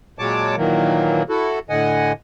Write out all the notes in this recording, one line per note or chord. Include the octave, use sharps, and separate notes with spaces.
A#2 F#3 G#3 C#5 A5 D6
A#2 D#3 E3 F#3 A#3
E4 F#4 A4
A2 D3 D#5 F#5 G#5